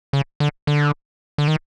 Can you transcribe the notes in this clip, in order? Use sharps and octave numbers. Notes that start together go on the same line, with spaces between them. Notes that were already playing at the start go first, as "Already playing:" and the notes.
C#3
D3
D3
D3
D#3